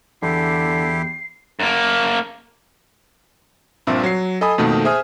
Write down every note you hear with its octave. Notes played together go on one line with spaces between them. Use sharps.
E2 D3 E4 G4 C7
F#2 A#3
A#1 G2 A#2 C4 E5
F#3 C7
A4 D#5 G#5 B5 D#6
F2 B2 D#3 A3 A#3
G#4 C5 E5 G#5 D#6 F6